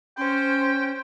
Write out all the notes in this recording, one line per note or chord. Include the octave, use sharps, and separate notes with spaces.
C#4 C5 G5